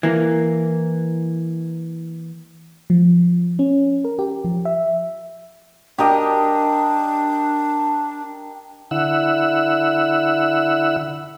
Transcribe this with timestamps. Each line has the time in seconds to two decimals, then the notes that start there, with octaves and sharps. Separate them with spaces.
0.03 E3 A#3
2.90 F3
3.59 C#4
4.04 A#4
4.19 G4
4.44 F3
4.65 E5
5.98 D4 G4 A#4 D#5
8.91 D3 E4 F#5 E6